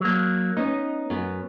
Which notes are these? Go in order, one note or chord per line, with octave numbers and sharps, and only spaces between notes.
F#3 A#3
B3 C#4 D#4
F#2 B3